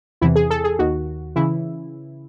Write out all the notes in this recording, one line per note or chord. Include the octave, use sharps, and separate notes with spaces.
E2 C3 E3 E4
G#4
A4
G#4
D#2 D#3 F#4
C#3 E3 E4